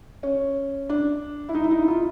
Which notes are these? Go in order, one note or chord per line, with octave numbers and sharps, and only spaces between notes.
C#4
D4
E4
D#4
E4
D#4
E4
F4